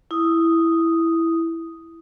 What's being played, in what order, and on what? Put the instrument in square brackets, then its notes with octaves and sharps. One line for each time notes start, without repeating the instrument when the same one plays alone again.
[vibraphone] E4 D#6